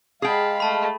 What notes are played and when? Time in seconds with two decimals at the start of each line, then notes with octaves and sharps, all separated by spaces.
0.22 G#3 G#4 F5 G5 A5 B5
0.60 A3 A5 B5